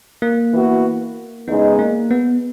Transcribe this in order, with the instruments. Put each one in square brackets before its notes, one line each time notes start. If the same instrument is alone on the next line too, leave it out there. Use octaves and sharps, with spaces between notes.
[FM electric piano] A#3
[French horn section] E3 B3 F#4
[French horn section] E2 C#3 G#3 D#4 [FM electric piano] B3
[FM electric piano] A#3
B3